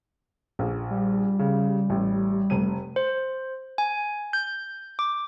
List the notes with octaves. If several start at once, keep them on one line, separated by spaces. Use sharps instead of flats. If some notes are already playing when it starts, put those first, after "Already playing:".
A#1
G3
C#3
A1
F1 D#7
C5
G#5
G6
D6